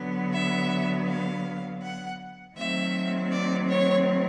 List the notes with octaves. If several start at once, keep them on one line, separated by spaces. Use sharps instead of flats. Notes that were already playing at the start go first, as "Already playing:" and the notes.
Already playing: D3 F#3 B3
E5
F5
F#5
D#3 F#3 A3 C4 E5
D5
C#5